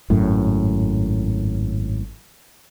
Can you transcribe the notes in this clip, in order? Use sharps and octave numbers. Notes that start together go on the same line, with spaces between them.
G#1 F#2 A2